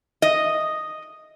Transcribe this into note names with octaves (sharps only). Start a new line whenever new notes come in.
D#5